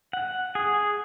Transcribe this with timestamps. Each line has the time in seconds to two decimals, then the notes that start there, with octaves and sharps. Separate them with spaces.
0.13 F#5
0.55 G#4